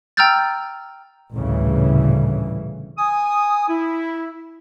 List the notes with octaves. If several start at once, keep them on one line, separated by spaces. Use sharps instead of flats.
G5 A#5 E6 F6 G6 A6
A1 D2 A#2 C#3 E3 G3
G#5 D#6
E4